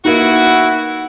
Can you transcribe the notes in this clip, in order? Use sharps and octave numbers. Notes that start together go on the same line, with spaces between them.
A#3 B3 D#4 E4 F#4